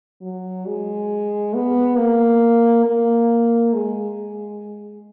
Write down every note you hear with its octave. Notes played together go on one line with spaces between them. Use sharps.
F#3
G#3
B3
A#3
A#3
G#3